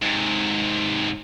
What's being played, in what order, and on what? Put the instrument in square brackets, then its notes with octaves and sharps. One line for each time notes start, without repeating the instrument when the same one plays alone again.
[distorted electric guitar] G#2 C3